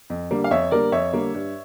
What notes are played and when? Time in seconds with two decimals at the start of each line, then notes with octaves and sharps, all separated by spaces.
0.10 F2
0.31 D3 G3 A#3
0.44 F5
0.51 F2 C#5 E5
0.71 D3 G3 A#3 A#4 D5
0.92 F2 C#5 E5
1.13 D3 G3 A#3
1.35 G2